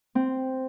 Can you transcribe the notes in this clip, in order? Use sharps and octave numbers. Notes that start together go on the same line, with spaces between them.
C4